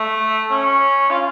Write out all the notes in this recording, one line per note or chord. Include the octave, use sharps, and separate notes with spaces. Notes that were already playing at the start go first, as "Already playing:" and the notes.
Already playing: A3
C#4
F4